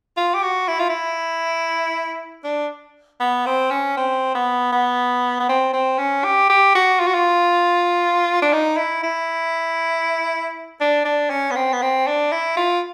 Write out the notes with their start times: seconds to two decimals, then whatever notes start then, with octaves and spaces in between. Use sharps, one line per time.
0.17 F4
0.34 G4
0.43 F#4
0.68 E4
0.79 F4
0.89 E4
2.44 D4
3.20 B3
3.46 C4
3.70 C#4
3.97 C4
4.35 B3
4.72 B3
5.40 B3
5.49 C4
5.73 C4
5.99 C#4
6.24 G4
6.50 G4
6.75 F#4
7.00 F4
7.07 F#4
7.14 F4
8.42 D4
8.53 D#4
8.77 E4
9.03 E4
10.80 D4
11.05 D4
11.30 C#4
11.51 B3
11.55 C4
11.72 B3
11.82 C4
12.07 D4
12.32 E4
12.57 F4